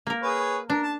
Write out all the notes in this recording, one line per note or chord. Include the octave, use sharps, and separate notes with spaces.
A#3 A#4
G#4 B4 C#5
D4 A#4
A5